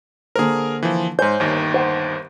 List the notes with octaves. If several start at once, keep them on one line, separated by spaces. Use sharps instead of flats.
D3 A#3 G#4 A#4 C5
E3 F3
G#2 C5 C#5 G#5 G6
G1 D#2 D#3
C5 F#5